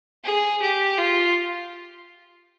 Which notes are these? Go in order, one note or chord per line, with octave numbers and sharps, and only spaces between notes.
G#4
G4
F4